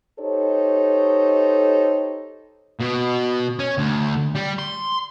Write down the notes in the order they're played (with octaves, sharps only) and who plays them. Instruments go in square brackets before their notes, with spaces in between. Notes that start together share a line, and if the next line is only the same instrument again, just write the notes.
[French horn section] D#4 G4 A4 C5 C#5
[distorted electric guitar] B2
C#4
D2
G3
C6